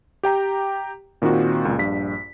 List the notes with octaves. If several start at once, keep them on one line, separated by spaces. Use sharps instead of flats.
G4 G5 A#5
A#2 D#3 C4 F4 F#4
C#2 A#2
A#1 G2 B6